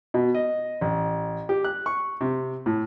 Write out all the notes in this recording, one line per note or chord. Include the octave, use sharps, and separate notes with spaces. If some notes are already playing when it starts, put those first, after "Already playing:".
B2
D#5
A1
G4
F#6
C#6
C3
A2